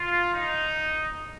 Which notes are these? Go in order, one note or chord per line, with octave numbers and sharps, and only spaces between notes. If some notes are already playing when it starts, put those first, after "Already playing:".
Already playing: F4
D#4